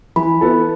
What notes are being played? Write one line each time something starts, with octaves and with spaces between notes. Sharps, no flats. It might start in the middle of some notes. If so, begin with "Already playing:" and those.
E3 B5
B3 E4 A4